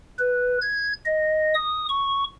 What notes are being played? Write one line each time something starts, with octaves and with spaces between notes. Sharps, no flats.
B4
G#6
D#5
D#6
C#6